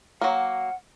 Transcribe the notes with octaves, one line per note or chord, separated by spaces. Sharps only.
F#3 A#3 F#5